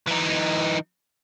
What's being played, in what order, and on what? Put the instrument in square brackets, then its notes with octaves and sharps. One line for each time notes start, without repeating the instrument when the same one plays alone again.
[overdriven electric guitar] E3 D#4